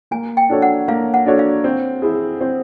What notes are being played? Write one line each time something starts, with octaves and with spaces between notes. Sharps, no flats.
A#3 G#5
G5
D4 F#4 A4 C#5
F#5
A#3 F5
F#5
D4 F#4 A4 C#5
F5
C4
E4 G#4
C4